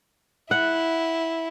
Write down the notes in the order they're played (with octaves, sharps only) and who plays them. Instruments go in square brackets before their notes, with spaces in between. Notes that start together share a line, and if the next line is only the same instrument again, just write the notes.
[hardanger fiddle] E4 [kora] F#5